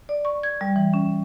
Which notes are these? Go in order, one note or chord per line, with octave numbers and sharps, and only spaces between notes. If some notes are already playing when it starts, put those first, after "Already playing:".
D5
C#6
G#6
G3
E3
C#4